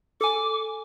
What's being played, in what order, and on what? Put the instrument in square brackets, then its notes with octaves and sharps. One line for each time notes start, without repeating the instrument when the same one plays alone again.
[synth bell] A4 G#5 [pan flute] D6